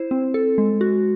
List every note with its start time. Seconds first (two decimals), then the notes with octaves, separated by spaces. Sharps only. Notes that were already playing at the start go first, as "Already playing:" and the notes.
Already playing: E4 C5
0.11 C4
0.34 A4
0.58 G#3
0.81 F#4